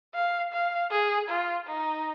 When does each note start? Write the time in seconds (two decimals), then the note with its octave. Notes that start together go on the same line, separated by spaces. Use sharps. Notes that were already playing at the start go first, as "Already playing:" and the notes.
0.15 F5
0.52 F5
0.91 G#4
1.29 F4
1.67 D#4